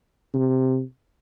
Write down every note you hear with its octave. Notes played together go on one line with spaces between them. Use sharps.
C3